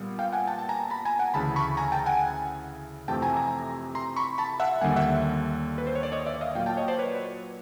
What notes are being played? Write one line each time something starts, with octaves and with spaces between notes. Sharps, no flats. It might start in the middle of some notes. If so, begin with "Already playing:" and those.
Already playing: A#2 G3 B3
F5 G5
F#5 G#5
G5 A5
A5
G#5 A#5
A5 B5
G#5 A#5
F#5 G#5
D2 C#3 E3 A5 B5
B5 C#6
G#5 A#5
G5 A5
F#5 G#5
F2 C3 E3 A3 C4 G5 A5
G#5 A#5
G#5 A#5
A#5 C6
B5 C#6
A5 B5
E5 F#5
D#2 D3 G3 A#3 F#5 G#5
E5 F#5
B4
C5
C#5
D5
C#5 D#5
D5 E5
D#5 F5
A#2 F#3 A#3 F5 G5
G5 A5
C#5 D#5
C5 D5
B4 C#5